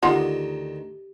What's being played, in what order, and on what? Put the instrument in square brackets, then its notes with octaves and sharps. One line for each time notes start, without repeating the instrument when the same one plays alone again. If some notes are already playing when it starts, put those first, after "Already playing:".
[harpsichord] D2 D#3 [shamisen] F4 D#5 F#5 [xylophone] G4